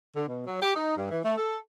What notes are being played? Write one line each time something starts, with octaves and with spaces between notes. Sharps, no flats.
D3
B2
F#3
G4
D#4
G2
E3
A3
A4